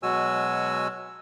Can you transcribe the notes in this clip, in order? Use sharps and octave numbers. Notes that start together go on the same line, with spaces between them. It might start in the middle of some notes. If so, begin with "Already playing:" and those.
B2 F#3 G#3 F#4 G#5 E6